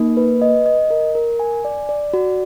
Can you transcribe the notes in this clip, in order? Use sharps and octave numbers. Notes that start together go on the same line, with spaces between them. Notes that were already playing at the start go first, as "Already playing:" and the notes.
Already playing: A#3 D#4
B4
D#5
D#5
A#4
A#4
G#5
D5
D5
F#4